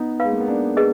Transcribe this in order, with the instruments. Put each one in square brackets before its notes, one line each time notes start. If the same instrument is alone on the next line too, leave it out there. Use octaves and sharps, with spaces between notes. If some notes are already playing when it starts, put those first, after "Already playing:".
Already playing: [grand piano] B3 D#4
[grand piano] G#3 [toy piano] B4 F5 B5
[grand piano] A#3
B3
A#3 D4
[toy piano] G#4 B4 D#5